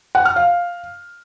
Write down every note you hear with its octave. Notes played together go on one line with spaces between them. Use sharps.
F#5
F6
F5